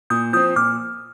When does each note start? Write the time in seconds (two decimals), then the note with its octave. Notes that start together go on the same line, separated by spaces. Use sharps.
0.10 A#2 D#6 G6
0.33 F3 C4 D#6 G6
0.56 A#2 D6 F6